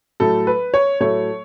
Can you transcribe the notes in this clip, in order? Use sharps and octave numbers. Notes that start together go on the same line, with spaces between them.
A2 F#3 A3 A4
B4
C#5
A2 F#3 A3 C#5